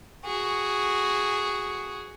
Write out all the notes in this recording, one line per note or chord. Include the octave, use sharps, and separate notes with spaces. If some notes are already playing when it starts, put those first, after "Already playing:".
F#4 G#4